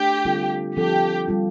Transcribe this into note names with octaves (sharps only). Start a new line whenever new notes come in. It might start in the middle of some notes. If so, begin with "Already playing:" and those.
Already playing: A3 D4 G4
D3 G3 C4 F4 A4
F3 C4 F4 G4 A4
G3 C4 F4